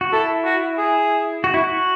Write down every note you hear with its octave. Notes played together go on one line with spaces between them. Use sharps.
F#4
E4 A4
F#4
G#4
F#4
E4
F#4